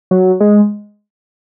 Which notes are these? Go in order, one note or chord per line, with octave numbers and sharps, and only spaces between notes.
F#3
G#3